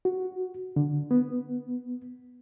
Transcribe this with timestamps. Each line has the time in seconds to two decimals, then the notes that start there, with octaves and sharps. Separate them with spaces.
0.05 F#4
0.76 D3
1.11 B3